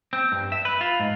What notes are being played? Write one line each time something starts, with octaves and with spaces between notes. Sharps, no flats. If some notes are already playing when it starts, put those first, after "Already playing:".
C4
G2
E5
B4
F4
G#2